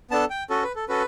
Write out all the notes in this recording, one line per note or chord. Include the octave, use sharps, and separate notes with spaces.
B3 D4 A4 A5
G5
C#4 F#4 A4
B4
A4
C#4 F#4 A4 B4